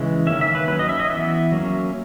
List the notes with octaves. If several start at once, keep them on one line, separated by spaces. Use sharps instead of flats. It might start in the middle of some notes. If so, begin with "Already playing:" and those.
Already playing: C#3 E3 G#3
D#3 A#3 C#4 E5
E5
B4
F#3 C#4 B4
D#5
E5
D#5
E3 B3 E5
F#3 A#3 C#4